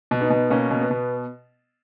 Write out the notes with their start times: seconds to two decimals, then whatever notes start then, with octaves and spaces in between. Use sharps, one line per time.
0.11 B2
0.21 B3 D#4
0.30 B2
0.50 B2 A#3 C#4
0.71 B2
0.81 B3
0.91 B2